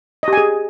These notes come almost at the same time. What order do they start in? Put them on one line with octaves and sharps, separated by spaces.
D#5 G4 G#5 G#4